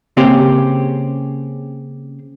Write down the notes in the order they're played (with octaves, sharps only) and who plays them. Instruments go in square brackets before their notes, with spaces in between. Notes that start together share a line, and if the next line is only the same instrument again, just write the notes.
[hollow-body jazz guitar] C#3 A#3 C4 C#4 G4 C5